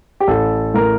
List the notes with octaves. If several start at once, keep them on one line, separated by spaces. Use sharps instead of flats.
G4
A1 A4
A2 A#4